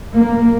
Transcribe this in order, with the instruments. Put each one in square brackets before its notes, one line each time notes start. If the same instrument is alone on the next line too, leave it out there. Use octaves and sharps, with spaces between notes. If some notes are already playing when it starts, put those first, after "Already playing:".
[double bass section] A#3